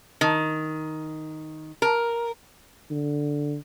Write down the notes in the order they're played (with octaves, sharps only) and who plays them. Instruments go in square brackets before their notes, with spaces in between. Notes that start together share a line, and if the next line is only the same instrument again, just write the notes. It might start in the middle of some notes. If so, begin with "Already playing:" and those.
[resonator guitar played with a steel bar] D#3
A#4
[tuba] D3